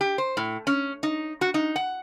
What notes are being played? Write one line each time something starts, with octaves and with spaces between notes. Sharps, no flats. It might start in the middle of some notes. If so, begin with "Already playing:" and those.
G4
C5
A2
C#4
D#4
F#4
D#4
F#5